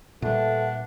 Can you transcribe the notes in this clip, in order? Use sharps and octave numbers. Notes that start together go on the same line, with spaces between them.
A#2 G3 A3 D4 B4 E5 F#5